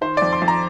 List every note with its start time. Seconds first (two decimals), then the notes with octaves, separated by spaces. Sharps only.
0.01 D#3 C5
0.17 F2 D5
0.33 C6
0.42 F2
0.48 A#5